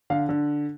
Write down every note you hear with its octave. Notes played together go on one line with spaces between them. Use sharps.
D3 F5
D3